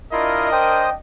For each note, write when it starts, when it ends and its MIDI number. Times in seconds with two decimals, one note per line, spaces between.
0.12 0.96 62
0.12 0.49 64
0.12 0.49 65
0.12 0.88 70
0.12 0.96 75
0.12 0.49 77
0.52 0.90 72
0.52 0.94 79
0.52 0.90 87